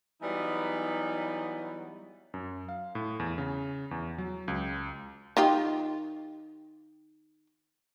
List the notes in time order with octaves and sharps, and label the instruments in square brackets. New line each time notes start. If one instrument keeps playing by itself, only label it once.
[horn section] E3 F#3 G3 B3 D#4
[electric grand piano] F#2
F5
A2
E2
C#3
E2
F#3
C#2
[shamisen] D#3 F4 G4